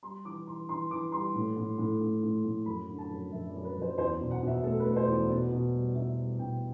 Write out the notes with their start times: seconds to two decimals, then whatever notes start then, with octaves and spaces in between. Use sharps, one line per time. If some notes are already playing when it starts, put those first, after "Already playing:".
0.03 G3 C6
0.24 E3 D6
0.47 E3 C6
0.69 E3 C6
0.91 E3 D6
1.12 G3 C6
1.35 A2
1.56 A2
1.78 A2
2.01 A2
2.23 A2
2.44 A2
2.66 F#2 B5
2.88 D3
2.99 A5
3.10 F#2
3.32 F#2 E5
3.49 D5
3.54 F#2
3.65 B4
3.76 F#2
3.81 C5
3.97 E2 C5
4.14 D5
4.20 B2
4.31 F#5
4.42 B2 E5
4.64 A3 A4
4.80 B4
4.85 A3
4.96 C5
5.07 E2
5.13 D5
5.29 B2 D5
5.51 B2
5.74 G3
5.95 B2 E5
6.16 G3
6.39 B2 G5